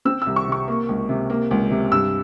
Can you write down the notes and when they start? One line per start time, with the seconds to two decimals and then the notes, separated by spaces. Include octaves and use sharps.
0.05 C4 E6
0.22 C2 E6
0.36 C#6
0.48 C3 C#6
0.68 A#3
0.89 C#2
1.09 C3
1.30 A#3
1.51 C#2
1.71 C3
1.92 G2 E6